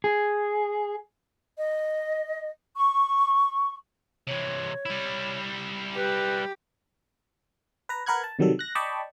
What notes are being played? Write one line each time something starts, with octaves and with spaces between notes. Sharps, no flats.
G#4
D#5
C#6
C3 E3 C#5
G3 E4
G4 B4
B4 A#5
A#4 B4 F#5 F#6 G#6
A5
C3 D#3 F#3 G3 A4
F#6 A#6
D5 D#5 G5 A5 B5 C#6